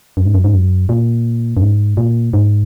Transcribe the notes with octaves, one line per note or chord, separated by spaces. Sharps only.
F#2
G#2
F#2
G#2
F#2
A#2
F#2
G#2
A#2
G#2